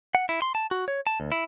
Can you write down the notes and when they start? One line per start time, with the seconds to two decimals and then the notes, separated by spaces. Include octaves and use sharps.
0.15 F#5
0.29 E4
0.42 C6
0.55 A5
0.71 F#4
0.88 C#5
1.07 A5
1.20 D2
1.32 E4